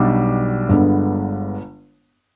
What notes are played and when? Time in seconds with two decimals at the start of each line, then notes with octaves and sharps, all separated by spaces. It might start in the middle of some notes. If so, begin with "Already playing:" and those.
Already playing: B1 B2 G3 D4
0.69 G1 G2 D3 G#3 B3